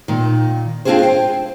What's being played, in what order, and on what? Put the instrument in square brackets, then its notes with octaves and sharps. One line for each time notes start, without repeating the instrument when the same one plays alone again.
[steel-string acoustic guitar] A#2 D#3
C4 D4 F4 G4 G#4 C5
C5 G5